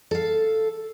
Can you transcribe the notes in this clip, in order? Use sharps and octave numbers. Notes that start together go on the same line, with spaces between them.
A4 F5